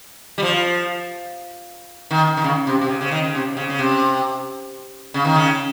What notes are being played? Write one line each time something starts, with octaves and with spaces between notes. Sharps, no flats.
G3
F3
D#3
D#3
C#3
C3
C3
C#3
C#3
D#3
C#3
C3
C#3
C#3
C3
C#3
D#3
C#3